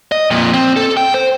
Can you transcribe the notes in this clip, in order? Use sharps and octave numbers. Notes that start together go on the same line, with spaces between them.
D#5
F2 A#2
C4
A4
G5
C5